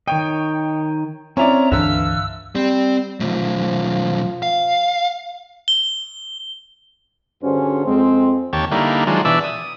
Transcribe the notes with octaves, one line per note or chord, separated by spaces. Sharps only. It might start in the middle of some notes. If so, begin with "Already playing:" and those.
D#3 C#5 D#5 G5
C4 C#4 E4 D5 A#5
C#2 G2 D3 E3 E5 F5 E6
G3 C4
B1 F3 A3
F5
G7
G2 D3 C#4 F#4 G#4 C5
F2 G#3 C4
D#2 G4 C#5 A5
D3 G3 A#3 D#4 E4
D#3 F3 F#3 G#3 D4
B2 E3 D4 D5 E5 E6
D#6